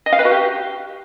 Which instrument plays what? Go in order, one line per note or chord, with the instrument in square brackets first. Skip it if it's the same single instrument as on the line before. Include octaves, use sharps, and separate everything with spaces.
[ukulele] D#5
F5
B4
F#4
G4